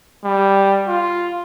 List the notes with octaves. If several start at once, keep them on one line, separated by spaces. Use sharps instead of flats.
G3
F4